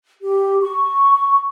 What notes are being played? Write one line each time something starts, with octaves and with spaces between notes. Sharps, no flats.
G4
C#6